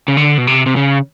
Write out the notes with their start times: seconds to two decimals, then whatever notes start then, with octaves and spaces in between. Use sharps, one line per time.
0.08 C#3
0.17 D3
0.38 B2
0.47 C3
0.66 C3
0.76 C#3